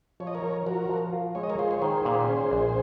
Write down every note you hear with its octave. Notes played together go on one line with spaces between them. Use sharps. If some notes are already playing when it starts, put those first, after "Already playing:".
F3 C#5
D#5
A#4 C#5
F3
F3 F#4 A#4
F3
F4
G#3 C#5
D#5
A#4 C#5
F4 G#4 C5
C#5
D#3 G#4 C5
A#2
C#4
A#1